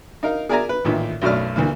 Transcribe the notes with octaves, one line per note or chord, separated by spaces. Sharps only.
D#4 A#4 F5
G#4 A#4 D5 E5 G#5 A#5
B4
A1 A#2 D#3 E5
B1 F#2 B2 A3 D5 F6
D2 E3 A#3